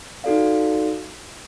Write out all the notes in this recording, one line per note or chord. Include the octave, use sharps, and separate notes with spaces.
D#4 F#4 A4 D5 F5